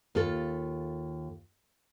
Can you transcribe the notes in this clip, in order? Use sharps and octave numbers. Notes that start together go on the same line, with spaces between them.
D#2 F4 A4